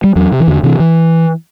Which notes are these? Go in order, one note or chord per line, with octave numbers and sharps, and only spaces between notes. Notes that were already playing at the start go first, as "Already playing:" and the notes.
G3
E2 F#3
C3
E3
E2 D3
C3 E3
E3